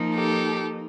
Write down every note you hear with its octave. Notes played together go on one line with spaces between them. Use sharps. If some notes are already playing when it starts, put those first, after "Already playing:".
Already playing: F3 A#3 D#4
G4 A4